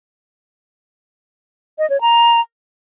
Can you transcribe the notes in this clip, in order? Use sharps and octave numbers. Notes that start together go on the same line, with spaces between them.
D#5
C#5
A#5